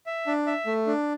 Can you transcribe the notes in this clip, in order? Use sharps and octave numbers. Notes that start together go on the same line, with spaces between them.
E5
D4
E5
A3
D4